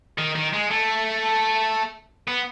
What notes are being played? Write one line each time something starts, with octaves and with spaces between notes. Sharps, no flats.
D#3
D#3
G#3
A3
B3